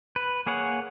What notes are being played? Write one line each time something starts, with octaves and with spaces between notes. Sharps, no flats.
B4
A#3 G#4 C#5 F#5